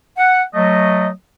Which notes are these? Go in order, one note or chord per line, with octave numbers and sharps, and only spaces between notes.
F#5
F#3 A3 D#5